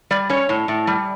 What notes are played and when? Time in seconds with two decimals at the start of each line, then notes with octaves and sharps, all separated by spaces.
0.11 G3 D5
0.29 C#4 C#5
0.49 A2
0.68 A2
0.87 G3